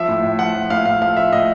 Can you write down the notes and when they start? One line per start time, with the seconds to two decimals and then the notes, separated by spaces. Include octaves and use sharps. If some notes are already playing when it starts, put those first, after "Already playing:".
Already playing: F3 E5
0.08 A2
0.23 A2
0.39 F3 F#5
0.55 F3
0.70 A2 F5
0.85 A2 F5
1.02 F3 F5
1.17 F3 E5
1.32 A2 D#5